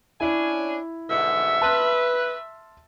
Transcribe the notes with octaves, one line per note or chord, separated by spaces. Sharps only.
C#4 D4 E4 G#5
G#2 B2 D3 E5
B4 A5 C6 F6